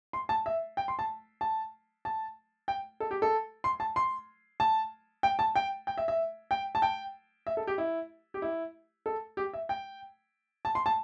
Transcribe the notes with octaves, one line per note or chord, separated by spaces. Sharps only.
C6
A5
E5
G5
C6
A5
A5
A5
G5
A4
G4
A4
C6
A5
C6
A5
G5
A5
G5
G5
E5
E5
G5
A5
G5
E5
A4
G4
E4
G4
E4
A4
G4
E5
G5
A5
C6
A5